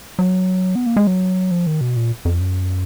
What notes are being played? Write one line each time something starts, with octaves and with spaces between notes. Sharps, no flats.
F#3
B3
A#3
G#3
F#3
F3
D#3
B2
A#2
F2
F#2